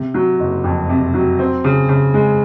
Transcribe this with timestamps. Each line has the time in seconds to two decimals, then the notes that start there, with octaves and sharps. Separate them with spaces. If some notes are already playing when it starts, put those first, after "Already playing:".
Already playing: C3
0.14 F#3
0.40 F#1
0.64 F2
0.89 C3
1.14 F#3
1.39 C4
1.64 C#3
1.89 C#3
2.14 G#3